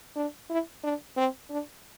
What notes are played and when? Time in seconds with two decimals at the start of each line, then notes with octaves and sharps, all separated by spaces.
0.16 D4
0.50 E4
0.84 D4
1.17 C4
1.50 D4